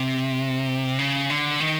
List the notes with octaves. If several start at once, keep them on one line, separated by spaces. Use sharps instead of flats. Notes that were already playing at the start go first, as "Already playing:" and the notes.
Already playing: C3
C#3
D3
D#3